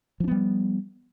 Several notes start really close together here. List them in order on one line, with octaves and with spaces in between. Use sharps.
F3 D4 B3 G3